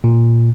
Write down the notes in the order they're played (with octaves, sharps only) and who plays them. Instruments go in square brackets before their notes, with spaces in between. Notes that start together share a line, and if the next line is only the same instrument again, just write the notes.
[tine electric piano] A#2